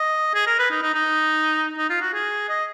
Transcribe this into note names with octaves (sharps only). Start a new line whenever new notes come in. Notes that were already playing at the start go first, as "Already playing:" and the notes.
Already playing: D#5
G#4
A#4
B4
D#4
D#4
D#4
D#4
F4
F#4
G#4
D#5